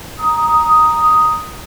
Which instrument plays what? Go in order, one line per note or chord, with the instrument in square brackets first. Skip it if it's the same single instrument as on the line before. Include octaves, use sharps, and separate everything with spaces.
[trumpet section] A#5 D#6